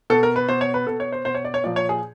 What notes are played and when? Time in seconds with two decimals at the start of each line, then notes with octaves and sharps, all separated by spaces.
0.10 B2 A4
0.23 A#4
0.36 B4
0.49 B2 C5
0.61 C#5
0.74 B4
0.87 B2 A4
1.00 C#5
1.12 C5
1.25 B2 C5
1.35 C#5
1.45 D5
1.54 C#5
1.64 A#2 F3 D5
1.76 C#5
1.89 G#4